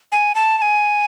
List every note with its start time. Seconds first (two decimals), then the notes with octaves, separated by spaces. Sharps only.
0.12 G#5
0.35 A5
0.58 A5
0.62 G#5